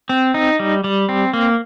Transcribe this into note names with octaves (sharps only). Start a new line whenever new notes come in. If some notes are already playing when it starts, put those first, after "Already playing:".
C4
D#4
G3
G3
C4
A#3